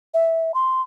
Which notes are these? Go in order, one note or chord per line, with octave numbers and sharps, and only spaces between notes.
E5
C6